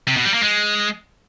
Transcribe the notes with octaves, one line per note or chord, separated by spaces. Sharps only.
C3
B2
G3
A#3
G#3